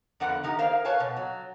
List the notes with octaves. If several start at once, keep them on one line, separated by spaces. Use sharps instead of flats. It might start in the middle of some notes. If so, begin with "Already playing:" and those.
F2 D3 B3 A#4 F#5
D#3 D#4 G4
A#3 A#4 C5 F5
B4 C#5 F5 G#5 A5
B2
F#3